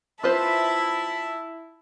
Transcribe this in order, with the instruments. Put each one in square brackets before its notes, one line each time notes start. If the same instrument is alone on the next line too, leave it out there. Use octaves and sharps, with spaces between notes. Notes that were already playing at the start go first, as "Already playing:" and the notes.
[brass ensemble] E4 [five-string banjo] F4 B4 C5 [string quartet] E5 A5 B5